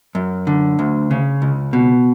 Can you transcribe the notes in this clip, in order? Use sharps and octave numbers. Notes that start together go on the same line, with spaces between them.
F#2
D3
D2
C#3
C#2
B2